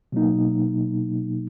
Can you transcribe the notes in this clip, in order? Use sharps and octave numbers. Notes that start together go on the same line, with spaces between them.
B2 F#3 A#3 D#4